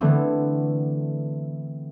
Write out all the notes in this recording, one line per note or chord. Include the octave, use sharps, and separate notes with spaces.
D3 E3 A3 B3 C4